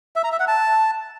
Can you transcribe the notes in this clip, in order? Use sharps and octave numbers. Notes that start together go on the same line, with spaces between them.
E5
A#5
E5
F#5
A5